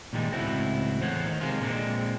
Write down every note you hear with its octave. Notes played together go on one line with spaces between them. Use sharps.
A#2 D#3 G3 G#3
C#2 A2 C4 E4 F#4
E2 A2 C5 C#5 F#5
D#3
C3 D#3 G#3 F4
A#2 D3 G#3 B3 C4